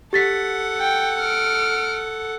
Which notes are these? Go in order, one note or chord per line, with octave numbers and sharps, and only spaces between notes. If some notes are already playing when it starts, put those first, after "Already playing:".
G4 A4 F#5 A6 B6
G5
F6 D7